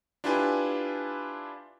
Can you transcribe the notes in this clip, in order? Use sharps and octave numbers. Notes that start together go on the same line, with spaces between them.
D4 E4 F4 G4 B4 G#5